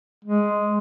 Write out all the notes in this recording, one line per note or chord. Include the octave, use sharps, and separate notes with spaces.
G#3